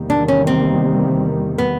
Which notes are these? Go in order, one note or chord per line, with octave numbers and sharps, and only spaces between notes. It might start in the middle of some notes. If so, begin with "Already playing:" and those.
Already playing: E2 C3 D#3 G3 A#3
D4
C#4
C4
B3